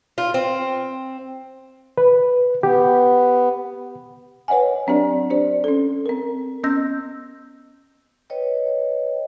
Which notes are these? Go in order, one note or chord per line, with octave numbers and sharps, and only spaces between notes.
F4
C4
B4
B3 G4
B4 C#5 D#5 F#5 G#5
F#3 C4 D4 G4 D5
D4 G4 C5 D5
C#4 A4
C4 A#4
B3 C#4 D#5 E6 G6 A#6
B4 C#5 D#5 G5